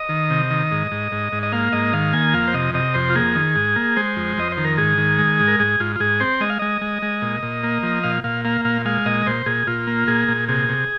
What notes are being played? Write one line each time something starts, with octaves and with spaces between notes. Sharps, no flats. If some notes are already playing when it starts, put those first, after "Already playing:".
Already playing: D#5
D#3
C3
D#3
G#2
G#2
G#2
G#2
D#5
A#3 F5
G#2 D#5
D#3 F5
A#3 G#5
F2 F5
C5
C3 D#5
C3 D#5
F2 C5
F4
A#3 G#4
D#3
G#2
A#3
G#3 C5
F2
F2 D#5
C5
D#3
A#4
G#2 G#4
D#3
G#3
G#2
A#4
G#2 G#4
G#2 F4
F4
G#2 G#4
C4 C5
G#3 D#5
F5
G#3 D#5
G#3
G#3
A#2
A#2
A#3
F3
A#2 F5
A#2 F5
A#3 F5
A#2 F5
G#3 F5
A#2 D#5
A#2 C5
A#2 G#4
A#2 F4
A#3
A#2 G#4
A#2
C3 G#4
C3